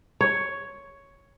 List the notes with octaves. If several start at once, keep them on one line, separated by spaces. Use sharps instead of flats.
C#5